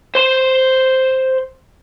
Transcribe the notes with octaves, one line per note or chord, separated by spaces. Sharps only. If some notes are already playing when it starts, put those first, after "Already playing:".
C5 C6